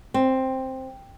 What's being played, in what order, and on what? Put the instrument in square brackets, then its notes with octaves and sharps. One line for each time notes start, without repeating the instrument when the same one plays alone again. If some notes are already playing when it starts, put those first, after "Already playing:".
[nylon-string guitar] C4